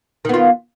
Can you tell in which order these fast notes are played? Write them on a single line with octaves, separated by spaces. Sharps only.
D#3 B3 F4